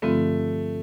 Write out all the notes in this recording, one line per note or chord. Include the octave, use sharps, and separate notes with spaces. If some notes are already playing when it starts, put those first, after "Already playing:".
G2 D3 F3 A3 C4 F4